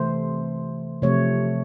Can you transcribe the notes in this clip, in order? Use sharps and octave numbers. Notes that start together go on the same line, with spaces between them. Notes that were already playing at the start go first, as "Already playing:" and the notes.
Already playing: C3 E3 A3 C5
C3 F3 A3 C#5